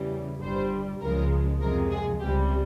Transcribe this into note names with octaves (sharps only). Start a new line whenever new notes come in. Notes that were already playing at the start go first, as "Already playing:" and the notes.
Already playing: E2 C#3 E3 G3
G1 G2 G3 C5
C#2 C#3 F3 G#3 A#4
F2 C3 F3 G#3 A#4
G#4
C#2 C3 G3 G4